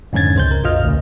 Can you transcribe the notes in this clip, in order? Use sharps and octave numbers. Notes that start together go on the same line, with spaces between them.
F2 G#2 D3 C#4 G#6 A6
C#2 C5 G6
A#4
A#1 F2 F4 D#5 F6
D2 C#3